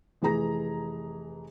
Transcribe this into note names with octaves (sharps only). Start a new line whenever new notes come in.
F1 E3 G#4 A#5 A#6